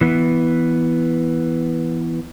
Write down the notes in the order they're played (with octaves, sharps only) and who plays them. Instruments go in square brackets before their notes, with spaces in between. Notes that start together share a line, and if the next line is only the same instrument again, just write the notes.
[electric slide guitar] E3 B3